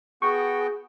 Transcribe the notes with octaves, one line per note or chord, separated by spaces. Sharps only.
B3 F#4 G#4 G5 C#6